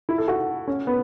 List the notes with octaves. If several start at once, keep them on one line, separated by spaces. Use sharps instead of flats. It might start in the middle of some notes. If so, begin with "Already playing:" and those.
E4
A4
F#4
C#4
B3